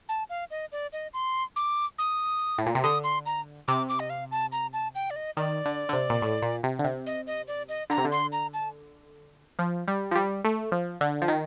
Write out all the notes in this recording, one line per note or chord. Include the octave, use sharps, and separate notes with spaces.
A5
F5
D#5
D5
D#5
C6
D6
D#6
A2
A#2
C3
D3 D#6
C6
A#5
C3 D6
D6
D#5
F5
A5
A#5
A5
G5
D5
D#5
D#3 D5
D3
D3
C3
A#2
A2
A#2
C3
D3
C3
D#5
D#5
D5
D#5
D3 A#5
C3
D3
C6
A#5
A5
F3
G3
F3
G3
A3
F3
D3
F3
D#3